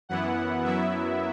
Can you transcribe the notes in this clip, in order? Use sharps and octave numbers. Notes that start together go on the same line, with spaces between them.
F#2 E3 B3 E4 F#5
F#2 F#3 B3 E4 E5